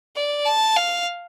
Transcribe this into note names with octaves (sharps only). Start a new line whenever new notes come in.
D5
A5
F5